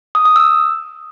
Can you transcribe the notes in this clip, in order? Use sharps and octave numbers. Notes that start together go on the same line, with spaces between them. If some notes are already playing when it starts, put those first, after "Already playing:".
D#6
D#6
E6